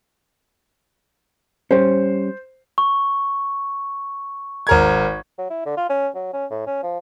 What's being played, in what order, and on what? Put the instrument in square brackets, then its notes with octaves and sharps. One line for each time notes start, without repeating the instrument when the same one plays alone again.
[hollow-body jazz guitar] G3 C#4 [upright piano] C5
[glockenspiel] C#6
[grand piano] G#1 A#4 G#6
[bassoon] F#3
E4
D3
F4
C#4
F#3
C#4
A2
C#4
F3